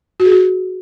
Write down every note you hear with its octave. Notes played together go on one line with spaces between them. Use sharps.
F#4
G#4
F#4